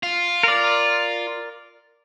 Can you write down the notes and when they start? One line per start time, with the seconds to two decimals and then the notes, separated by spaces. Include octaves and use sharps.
0.03 F4
0.43 A#4 D5